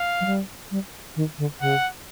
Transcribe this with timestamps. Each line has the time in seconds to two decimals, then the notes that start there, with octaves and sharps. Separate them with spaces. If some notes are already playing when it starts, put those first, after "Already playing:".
Already playing: F5
0.21 F#3
0.26 G3
0.71 G3
1.16 D#3
1.38 D3
1.61 C#3 F#5